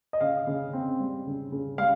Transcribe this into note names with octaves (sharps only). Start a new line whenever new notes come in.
D#5
C#3 F5
C#3
C4
G3
C#3
C#3
G3 F5